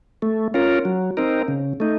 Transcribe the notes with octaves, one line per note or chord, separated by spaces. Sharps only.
A3
C#4 F4 A#4
F#3
C4 D#4 A#4
C#3
A3 D#4